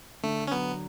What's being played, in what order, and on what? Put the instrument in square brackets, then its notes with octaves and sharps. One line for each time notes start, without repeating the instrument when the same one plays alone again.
[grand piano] D3 [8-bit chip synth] A3
[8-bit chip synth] C#4
[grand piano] F#3 [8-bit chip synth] B3